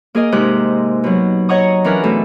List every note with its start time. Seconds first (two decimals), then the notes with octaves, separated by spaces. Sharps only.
0.15 A#3 G#4 A#4 D#5
0.32 G#2 C3 G#3 G4 A#4 F#6
1.04 B2 F#3
1.49 C#5 D#5 F#5 A#5 C#6 D#6
1.84 E3 C#4 D4 A#4 B4
2.04 B2 A3 C4 A4